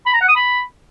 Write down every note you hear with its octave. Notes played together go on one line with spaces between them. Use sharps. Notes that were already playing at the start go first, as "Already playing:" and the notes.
B5
A#5
F#5
D#6
B5